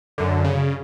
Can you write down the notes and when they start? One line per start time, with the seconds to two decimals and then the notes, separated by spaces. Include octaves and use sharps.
0.18 F#2 D3
0.44 C#3